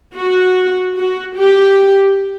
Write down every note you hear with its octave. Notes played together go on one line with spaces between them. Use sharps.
F#4
F#4
G4